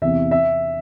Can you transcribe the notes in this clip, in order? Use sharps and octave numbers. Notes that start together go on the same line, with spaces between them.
E2 C3 E3 E5
E5